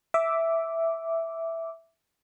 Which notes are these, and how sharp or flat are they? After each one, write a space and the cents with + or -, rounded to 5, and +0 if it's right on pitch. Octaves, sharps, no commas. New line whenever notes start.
E5 +0 D6 -5